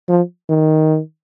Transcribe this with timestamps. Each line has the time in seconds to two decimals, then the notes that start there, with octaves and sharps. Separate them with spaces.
0.09 F3
0.49 D#3